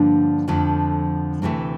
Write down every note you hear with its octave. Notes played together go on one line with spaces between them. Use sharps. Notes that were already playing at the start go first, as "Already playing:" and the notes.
Already playing: G2 D3 F3 A#3 D4
F2 D3 F3 A3
D2 C3 E3 A3